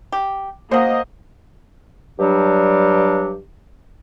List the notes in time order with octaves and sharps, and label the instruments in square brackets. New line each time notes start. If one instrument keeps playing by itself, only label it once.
[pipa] G4
[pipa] C#3 F#3 [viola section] A#3 D#5 [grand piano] C5 F5 F#5
[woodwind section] G2 F#3 G3 D4 G4